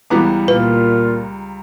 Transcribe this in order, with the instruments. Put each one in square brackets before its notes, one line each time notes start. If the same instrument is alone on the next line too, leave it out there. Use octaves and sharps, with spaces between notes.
[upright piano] C#2 G3 A#5 [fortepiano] E3 B3 D6
[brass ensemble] A#2 F4 [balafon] B4